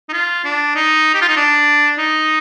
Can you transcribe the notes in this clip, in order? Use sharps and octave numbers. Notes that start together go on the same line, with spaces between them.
D#4
F4
D4
D#4
G4
F4
D#4
D4
D#4